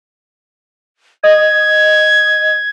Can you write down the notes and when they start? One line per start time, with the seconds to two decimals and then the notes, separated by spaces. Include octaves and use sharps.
1.24 D#5 G#6